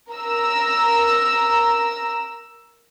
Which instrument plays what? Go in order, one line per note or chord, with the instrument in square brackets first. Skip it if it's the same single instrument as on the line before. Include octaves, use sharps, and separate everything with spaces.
[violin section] A#4 A#5 E6